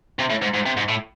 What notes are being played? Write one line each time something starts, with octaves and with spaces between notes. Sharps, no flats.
C3
A2
G#2
G#2
C3
G#2
A2